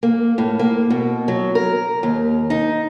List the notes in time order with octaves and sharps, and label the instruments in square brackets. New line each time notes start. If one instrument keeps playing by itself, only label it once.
[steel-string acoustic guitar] A#3
A2
A#3
B2
F#3
A#4
D#2
D#4